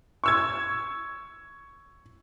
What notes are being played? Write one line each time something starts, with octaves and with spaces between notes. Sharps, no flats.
C#6 E6 G#6